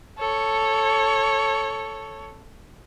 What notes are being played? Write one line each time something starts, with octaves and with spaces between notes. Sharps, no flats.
A4 C#5